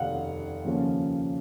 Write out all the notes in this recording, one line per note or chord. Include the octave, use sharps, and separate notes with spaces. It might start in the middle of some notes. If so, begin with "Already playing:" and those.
Already playing: F1 D#2 D#3 F5 F#5
D#2 C#3 F3 A#3 C#4